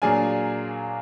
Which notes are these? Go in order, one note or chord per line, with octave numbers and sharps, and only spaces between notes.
A#2 F#3 A#3 D4 F4 G#4 G#5